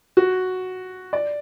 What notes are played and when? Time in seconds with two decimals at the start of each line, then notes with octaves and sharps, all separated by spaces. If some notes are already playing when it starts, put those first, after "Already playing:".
0.17 F#4
1.13 D5